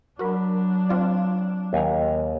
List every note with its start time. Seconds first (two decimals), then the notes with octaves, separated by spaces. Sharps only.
0.19 F#3 D4 F#4 A#4 B5
0.89 C4 F4 D5
1.73 D#2 G#5 A#5